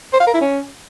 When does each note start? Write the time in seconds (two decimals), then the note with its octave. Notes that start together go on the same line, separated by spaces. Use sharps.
0.13 C5
0.20 F5
0.27 A#4
0.34 E4
0.41 C#4